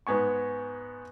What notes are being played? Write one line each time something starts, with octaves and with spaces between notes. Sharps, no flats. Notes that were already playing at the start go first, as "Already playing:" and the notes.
G#2 B3 G#5 C#6